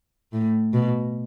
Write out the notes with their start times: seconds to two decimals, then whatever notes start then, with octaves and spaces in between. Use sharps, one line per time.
0.32 A2
0.73 B2